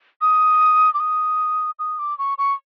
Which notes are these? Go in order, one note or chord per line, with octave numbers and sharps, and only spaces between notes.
D#6
D6
D#6
D#6
D6
C#6
C#6